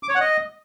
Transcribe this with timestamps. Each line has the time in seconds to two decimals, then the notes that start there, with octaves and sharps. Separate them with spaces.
0.03 D6
0.09 C#5
0.15 F#5
0.21 D#5